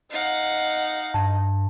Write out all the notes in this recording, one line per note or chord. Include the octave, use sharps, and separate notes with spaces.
D#4 F5 F#5
G2 A5